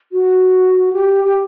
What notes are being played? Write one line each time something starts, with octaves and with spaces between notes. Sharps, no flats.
F#4
G4
G4